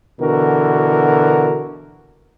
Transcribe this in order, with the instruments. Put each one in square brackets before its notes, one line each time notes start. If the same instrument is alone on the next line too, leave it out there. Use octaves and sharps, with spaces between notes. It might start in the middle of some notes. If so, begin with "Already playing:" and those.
[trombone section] B2 D3 E3 F#4 A#4